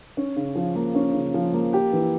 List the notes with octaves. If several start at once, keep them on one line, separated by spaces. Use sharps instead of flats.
C#4
C#3
F3
A#3
C#4
C#3
F3
A#3
G4
E3